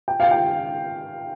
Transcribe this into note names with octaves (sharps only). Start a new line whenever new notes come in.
G5
F5
G5